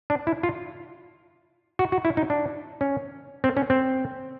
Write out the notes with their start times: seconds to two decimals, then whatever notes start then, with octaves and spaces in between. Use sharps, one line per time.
0.10 D4
0.27 E4
0.43 F4
1.79 F#4
1.92 F#4
2.05 E4
2.17 D#4
2.30 D4
2.81 C#4
3.44 C4
3.57 C#4
3.70 C4